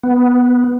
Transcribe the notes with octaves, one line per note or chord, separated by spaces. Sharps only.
B3